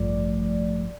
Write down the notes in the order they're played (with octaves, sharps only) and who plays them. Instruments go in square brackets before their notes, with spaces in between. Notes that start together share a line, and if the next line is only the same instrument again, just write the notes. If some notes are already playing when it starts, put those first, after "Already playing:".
Already playing: [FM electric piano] A1 G2 F3 A3 D5